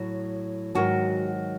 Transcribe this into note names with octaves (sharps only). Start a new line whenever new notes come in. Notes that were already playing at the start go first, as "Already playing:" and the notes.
Already playing: A2 F#3
G#2 D#3 F#3 F#4